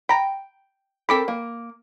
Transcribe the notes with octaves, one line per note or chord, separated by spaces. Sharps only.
G5 A#5 B5
C4 A4 A#4 B5 D6 B6
A#3